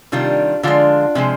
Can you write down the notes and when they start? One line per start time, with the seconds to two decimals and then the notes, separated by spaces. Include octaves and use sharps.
0.12 C3 D#3 G3 D4 F4
0.63 D3 F3 G#3 D4 F4
1.15 C3 F3 G#3